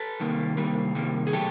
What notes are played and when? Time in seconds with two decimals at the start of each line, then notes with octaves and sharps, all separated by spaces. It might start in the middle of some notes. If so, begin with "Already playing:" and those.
Already playing: A4 B4
0.20 C3 D#3 G3 A#3
0.57 C3 D#3 G3 A#3
0.95 C3 D#3 G3 A#3
1.27 G#4
1.33 B2 F#3 A3 G4 A4